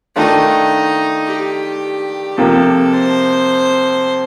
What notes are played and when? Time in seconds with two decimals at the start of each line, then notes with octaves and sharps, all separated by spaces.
0.16 D#3 A3 D4 D#4 F4
1.26 G4
2.37 C3 F3 A#3 A4
2.93 C5